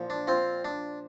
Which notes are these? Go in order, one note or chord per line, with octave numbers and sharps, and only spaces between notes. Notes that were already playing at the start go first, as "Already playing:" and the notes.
Already playing: A#2 F3
D4
C4 F4
D4